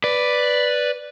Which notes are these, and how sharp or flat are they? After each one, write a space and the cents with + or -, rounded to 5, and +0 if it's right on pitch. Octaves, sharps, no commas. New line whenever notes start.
B4 +0 D5 +0